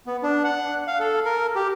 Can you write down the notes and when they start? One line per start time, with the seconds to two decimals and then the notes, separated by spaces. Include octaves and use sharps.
0.06 B3
0.23 D4
0.44 F#5
0.87 F5
1.00 A4
1.25 A#4
1.56 G4